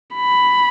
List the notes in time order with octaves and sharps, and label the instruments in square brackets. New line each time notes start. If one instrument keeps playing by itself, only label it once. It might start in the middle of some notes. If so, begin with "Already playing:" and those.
[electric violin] B5